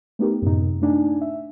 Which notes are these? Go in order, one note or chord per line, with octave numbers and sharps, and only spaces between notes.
A3 B3 D#4 G4 A#4
F#2 A2 C3 D#4
A3 D4 D#4 G#5
E5